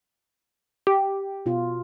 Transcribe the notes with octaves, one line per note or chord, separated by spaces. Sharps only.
G4
B2 F4